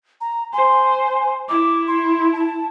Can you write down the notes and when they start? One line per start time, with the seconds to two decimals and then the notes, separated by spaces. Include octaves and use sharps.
0.21 A#5
0.53 C5 G#5
1.49 E4 D6
1.88 C6
2.33 A5